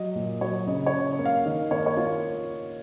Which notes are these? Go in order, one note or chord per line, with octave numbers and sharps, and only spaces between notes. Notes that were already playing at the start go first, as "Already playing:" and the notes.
Already playing: F#3 D#5
A#2
F#3 C#5
C#3 D#5
C#5
C#3
A#3
F5
D#3 D#5
A#3 C#5
D#5
C#5
A#3 F4